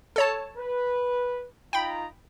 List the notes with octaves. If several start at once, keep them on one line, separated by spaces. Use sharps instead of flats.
A4 C#5 A5
B4
D#4 F4 G5 A#5 B5